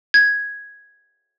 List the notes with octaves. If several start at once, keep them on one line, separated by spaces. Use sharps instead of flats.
G#6